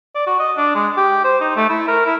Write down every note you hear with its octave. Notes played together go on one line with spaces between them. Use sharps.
D5
F#4
D#5
D4
G#3
G4
C5
D#4
A3
E4
A#4
E4